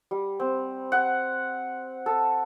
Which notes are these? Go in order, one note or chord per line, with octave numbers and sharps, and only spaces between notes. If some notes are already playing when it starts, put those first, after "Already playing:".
G3
C4
F#5
A4